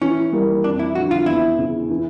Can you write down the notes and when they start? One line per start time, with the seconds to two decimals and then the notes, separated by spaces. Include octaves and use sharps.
0.02 E3 C#4
0.33 G3 A#3
0.64 F2 D4
0.79 E4
0.95 D3 F3 F#4
1.11 F4
1.26 E2 E4
1.58 C#3 E3
1.90 E3